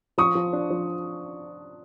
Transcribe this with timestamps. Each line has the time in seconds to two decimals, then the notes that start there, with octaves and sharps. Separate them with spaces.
0.18 F3 C#6 D#6
0.35 F3
0.53 D4
0.70 F3